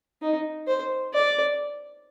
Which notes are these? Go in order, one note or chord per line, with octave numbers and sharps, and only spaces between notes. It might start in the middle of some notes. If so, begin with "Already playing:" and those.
D#4
C5
D5